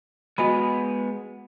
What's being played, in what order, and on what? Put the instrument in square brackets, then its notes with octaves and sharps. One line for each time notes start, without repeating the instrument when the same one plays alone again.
[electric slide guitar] G#3 B3 G#4 [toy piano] F#4 D#5 B5